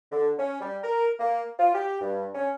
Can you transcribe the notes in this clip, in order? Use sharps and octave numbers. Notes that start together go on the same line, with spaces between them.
D3
C#4
G3
A#4
A#3
F4
G4
G2
C#4